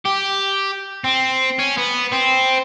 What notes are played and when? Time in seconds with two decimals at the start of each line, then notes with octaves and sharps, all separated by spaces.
0.05 G4
1.04 C4
1.59 C#4
1.77 B3
2.12 C4